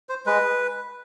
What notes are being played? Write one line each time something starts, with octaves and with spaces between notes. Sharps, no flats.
C5
G#3 B4